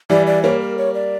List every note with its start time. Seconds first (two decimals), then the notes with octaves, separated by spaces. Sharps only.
0.10 E3 G3 D5
0.27 D5
0.43 G3 A#3 C#5
0.60 A#4
0.78 C#5
0.94 D5